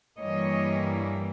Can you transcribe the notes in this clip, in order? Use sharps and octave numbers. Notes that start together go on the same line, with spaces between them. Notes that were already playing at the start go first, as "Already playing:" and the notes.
G2 E3 G3 A#3 C#5 D#5